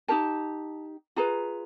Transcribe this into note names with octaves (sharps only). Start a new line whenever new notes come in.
D#4 G4 A#4 A5
F4 G#4 B4 A#5